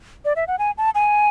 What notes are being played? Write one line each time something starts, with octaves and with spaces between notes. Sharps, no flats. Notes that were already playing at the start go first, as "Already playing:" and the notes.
D5
E5
F#5
G#5
A5
G#5